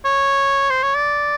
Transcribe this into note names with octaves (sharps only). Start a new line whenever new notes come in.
C#5
C5
C#5
D5